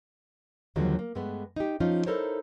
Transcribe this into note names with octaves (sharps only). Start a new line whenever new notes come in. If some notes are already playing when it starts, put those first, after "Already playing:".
D#2 D3 F3 F#3 G#3
A#3
G2 G#3 A3 B3
D#4 G4
F3 C#4 D#4 F4
D#4 E4 A4 A#4 C5 C#5